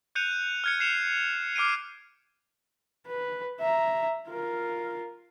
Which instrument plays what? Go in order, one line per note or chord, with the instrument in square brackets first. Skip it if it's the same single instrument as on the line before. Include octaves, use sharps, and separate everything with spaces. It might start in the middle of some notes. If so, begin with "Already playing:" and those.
[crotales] F#6 G6 C#7 D#7 F7
F6 G#6 C#7
F6 C7 C#7 E7 F7
D6 F6 C7 D7 D#7
[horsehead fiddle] B4
E5 A#5
F4 A#4